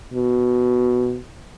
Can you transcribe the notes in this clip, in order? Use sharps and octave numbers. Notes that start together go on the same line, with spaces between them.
B2